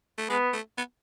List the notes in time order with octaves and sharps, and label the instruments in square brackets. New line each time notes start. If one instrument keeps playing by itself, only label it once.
[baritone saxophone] A3
[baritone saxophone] G#3 [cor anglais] B3
[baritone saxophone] A3
B3